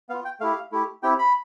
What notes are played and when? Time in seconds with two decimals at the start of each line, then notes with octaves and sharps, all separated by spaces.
0.09 B3 F5
0.14 F4
0.25 G5
0.40 A3 E4 G4 F5
0.72 A3 E4 G4
1.03 C4 E4 G4 G5
1.19 B5